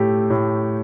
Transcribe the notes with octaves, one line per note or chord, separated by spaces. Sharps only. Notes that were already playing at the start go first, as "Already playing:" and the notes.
Already playing: A2 A3 G4
A2